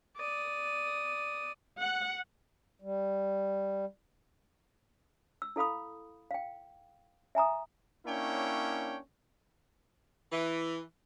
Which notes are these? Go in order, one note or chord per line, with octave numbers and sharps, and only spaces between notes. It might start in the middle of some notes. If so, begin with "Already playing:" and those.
D5 D#6
F#5
G3
E6
E4 A4 F5 B5 D#6
F5 G5
E5 G#5 A#5 D#6
A#3 C#4 D4 E4 C#5 G5
E3